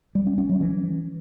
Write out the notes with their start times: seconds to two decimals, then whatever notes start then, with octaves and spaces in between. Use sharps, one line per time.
0.15 G3
0.27 C#4
0.38 C#4
0.49 F#3
0.61 E3